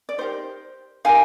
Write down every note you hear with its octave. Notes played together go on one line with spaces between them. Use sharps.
D5
D#4 G4 A#4 C5
D#4 G4 A#4 F5 G#5